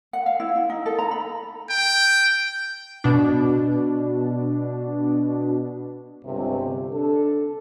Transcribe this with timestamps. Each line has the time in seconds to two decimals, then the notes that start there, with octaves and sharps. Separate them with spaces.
0.13 F#5
0.26 F5
0.40 E4
0.56 E4
0.70 D#4
0.86 A4
0.98 A#5
1.11 B5
1.70 G5
3.04 B2 D4
6.23 G1 C#2 C3
6.92 D4 A4